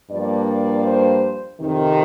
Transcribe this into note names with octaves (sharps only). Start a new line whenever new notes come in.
G2 F3 A#3 D4 D5
C5
F2 C3 D#3